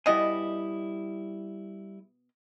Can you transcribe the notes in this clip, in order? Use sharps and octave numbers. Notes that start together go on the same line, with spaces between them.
B2 G3 E4 D#5 G#5